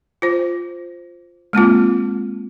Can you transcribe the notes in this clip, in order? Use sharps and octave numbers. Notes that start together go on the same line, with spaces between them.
F4 C5
G#3 A#3 C4 F4